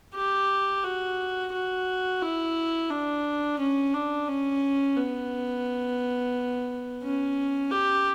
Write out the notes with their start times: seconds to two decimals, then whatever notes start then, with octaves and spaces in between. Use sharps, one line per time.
0.15 G4
0.84 F#4
1.53 F#4
2.22 E4
2.90 D4
3.59 C#4
3.93 D4
4.28 C#4
4.97 B3
7.03 C#4
7.71 G4